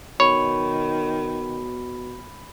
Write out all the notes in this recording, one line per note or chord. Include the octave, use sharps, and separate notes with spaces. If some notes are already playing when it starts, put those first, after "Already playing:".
B2 D#3 C#5 B5